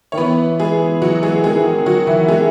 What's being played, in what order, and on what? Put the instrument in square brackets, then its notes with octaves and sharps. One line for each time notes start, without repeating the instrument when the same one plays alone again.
[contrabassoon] D#3 [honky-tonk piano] C#5
[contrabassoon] E3 [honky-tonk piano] B3 B4
[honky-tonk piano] G#3 G#4
F#3 F#4
G#3 G#4
[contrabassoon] D#3 [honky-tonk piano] G#3 G#4
[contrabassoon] E3
D#3
[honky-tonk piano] F#3 F#4
E3 E4
G#3 G#4